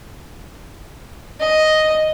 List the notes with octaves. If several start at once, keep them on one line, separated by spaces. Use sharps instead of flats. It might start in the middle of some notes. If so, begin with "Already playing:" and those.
D#5